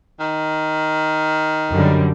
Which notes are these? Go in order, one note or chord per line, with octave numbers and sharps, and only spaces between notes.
D#3
F#2 D3 G3